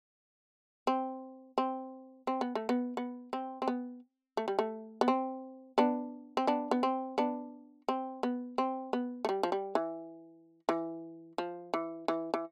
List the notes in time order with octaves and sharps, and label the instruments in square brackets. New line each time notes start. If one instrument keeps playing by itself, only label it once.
[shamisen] C4
C4
C4
B3
A3
B3
B3
C4
C4
B3
A3
G3
A3
B3
C4
B3 D4
C4
B3 D4
B3
C4
B3 D4
C4
B3
C4
B3
A3
G3
F3
G3
E3
E3
F3
E3
E3
E3